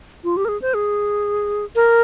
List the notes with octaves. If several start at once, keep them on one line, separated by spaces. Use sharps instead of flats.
F4
G4
A#4
G#4
C5
G#4
A#4